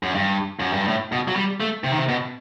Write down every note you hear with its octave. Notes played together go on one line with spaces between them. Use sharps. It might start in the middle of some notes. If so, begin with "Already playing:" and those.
F#2
G2
F#2
G2
A2
B2
F#3
G3
A3
C3
D#3
C3
B2